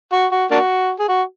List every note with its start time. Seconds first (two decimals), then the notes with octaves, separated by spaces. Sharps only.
0.12 F#4
0.32 F#4
0.51 A#3 D4 F#4
1.00 G#4
1.08 F#4